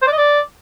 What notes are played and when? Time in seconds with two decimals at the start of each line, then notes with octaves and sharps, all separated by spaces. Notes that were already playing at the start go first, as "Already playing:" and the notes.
0.02 C5
0.07 D5
0.12 D#5
0.18 D5